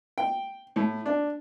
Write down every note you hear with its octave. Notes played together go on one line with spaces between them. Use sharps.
G5
A2
D4